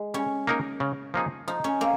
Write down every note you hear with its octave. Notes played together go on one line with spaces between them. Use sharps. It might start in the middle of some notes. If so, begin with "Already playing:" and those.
Already playing: G#3
G3 C#4
A#3 D#4 A#4
C#3
F3 A#3 D#4 G#4
F3 D#4
C#4
A#3 C4